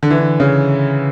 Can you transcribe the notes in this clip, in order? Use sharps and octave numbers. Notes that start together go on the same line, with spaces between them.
D3
E3
D3
C#3